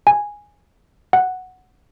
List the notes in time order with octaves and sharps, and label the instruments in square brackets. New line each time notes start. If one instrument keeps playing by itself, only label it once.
[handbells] G#5
F#5